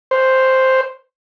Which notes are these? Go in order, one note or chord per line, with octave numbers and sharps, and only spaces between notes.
C5